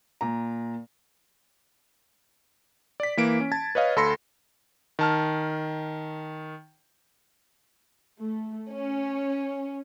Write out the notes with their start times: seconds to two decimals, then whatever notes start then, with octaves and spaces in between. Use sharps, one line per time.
0.21 A#2 A#5
3.00 D5 B6
3.17 E3 A#3 D7
3.40 C#4
3.52 A5 G#6 A6
3.75 B4 C#5 D#5 F5
3.96 D2 A4 B5 C6 A#6 C#7
4.99 D#3 A5 F6
8.18 A3
8.72 C#4